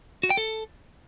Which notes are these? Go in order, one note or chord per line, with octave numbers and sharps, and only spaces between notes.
F#4
G5
A4